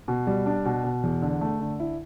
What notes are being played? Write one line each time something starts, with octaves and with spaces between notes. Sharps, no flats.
B2
G3
D4
B2
B2
E2
D3
A3
D3
E4